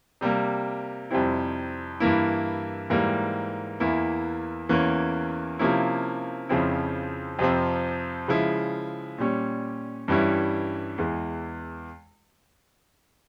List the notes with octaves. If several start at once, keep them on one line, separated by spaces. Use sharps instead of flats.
C3 G3 A#3
F2 C3 G3 C4 E4
G2 E3 A#3 E4
G#2 E3 G3 A#3
E2 E3 A#3 E4
E2 E3 A#3 C#4
C3 F3 A#3 C#4 E4
F2 C#3 F3 C4 E4
F2 C3 F3 C4
C#3 F3 G#3 E4
A#2 G3 C#4
G2 E3 G3 C#4 E4
E2 E3 G#3